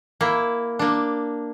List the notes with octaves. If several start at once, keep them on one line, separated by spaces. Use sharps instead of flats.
A#3 E4
A#3 D4